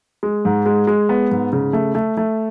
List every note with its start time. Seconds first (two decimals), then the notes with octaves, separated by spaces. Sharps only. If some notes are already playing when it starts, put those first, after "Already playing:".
0.23 G#3
0.45 G#2
0.66 G#3
0.87 G#3
1.09 B3
1.31 G#2
1.53 C#3
1.73 A3
1.95 A3
2.17 A3